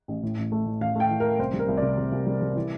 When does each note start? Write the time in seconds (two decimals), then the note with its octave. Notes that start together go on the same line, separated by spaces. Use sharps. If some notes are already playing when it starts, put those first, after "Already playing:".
0.08 A1
0.23 A2
0.37 A1
0.52 A3
0.66 A2
0.81 A1 F5
0.95 A3 G5
1.09 E3
1.20 A3 A#4
1.39 C2 C5
1.53 G3
1.59 A#4
1.68 C2
1.77 C3 D5
1.98 C2
2.12 C2
2.27 G3
2.42 G3
2.56 E3